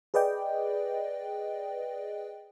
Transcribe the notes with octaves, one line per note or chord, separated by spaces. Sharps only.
G#4 B4 D5 D#5 G5